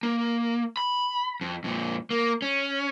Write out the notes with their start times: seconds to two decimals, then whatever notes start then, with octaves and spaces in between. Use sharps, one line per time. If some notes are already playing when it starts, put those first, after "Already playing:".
0.03 A#3
0.77 B5
1.41 F2
1.64 F2 A#2
2.11 A#3
2.42 C#4